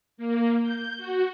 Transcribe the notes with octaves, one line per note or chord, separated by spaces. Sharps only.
A#3
G6
F#4